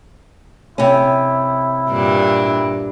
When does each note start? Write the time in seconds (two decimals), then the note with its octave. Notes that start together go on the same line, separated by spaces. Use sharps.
0.78 C3 C#4 E4
1.89 G2 A#2 D4